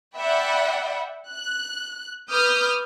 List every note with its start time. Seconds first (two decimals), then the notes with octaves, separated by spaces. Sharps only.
0.17 D5 E5 F#5 G5 B5
1.31 F#6
2.30 B4 D6 D#6 F6 G6